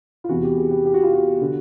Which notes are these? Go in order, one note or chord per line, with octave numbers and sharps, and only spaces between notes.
F4
E2 C3 E3 F#4
G4
G#4
G4
G4
F#4
F4
F#4
D3